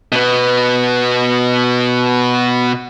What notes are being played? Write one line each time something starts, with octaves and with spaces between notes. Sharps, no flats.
B2 B3